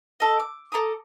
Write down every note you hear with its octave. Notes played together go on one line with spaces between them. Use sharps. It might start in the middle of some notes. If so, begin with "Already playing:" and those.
A4 D#5
D6
A4 A#5 D6 D#6